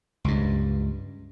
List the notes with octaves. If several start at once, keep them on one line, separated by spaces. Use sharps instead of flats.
C#2 G2